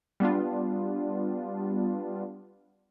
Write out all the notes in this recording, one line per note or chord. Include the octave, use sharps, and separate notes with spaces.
G3 B3 D4 F4